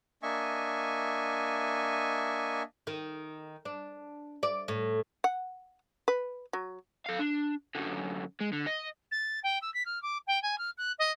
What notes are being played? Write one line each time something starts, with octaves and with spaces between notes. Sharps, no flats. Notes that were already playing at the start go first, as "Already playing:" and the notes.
A#3 D4 D#5 E5 G#5 C#6
D#3
D4
D5
A2
F#5
B4
F#3
A4 F5
D4
F#2 D3
G#3
D3
D#5
A6
G5
E6
B6
F6
D6
G5
G#5
F6
F#6
D#5